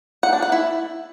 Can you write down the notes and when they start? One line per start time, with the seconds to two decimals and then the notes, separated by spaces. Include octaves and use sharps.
0.23 F#5
0.33 D4
0.42 F#5
0.52 E4